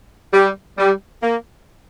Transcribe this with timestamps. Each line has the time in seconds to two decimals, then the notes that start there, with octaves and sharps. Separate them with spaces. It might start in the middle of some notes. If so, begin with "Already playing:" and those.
0.33 G3
0.78 G3
1.22 A#3